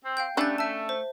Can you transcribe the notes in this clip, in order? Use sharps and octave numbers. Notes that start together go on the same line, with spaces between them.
C4
F5 G5 G6
G3 A3 C#4 D4 F#6 G6 A6
A3 E5 A5
C5